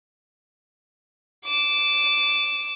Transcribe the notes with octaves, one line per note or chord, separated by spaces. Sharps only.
D6 E7